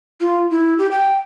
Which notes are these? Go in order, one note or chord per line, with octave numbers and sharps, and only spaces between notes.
F4
E4
G4
G5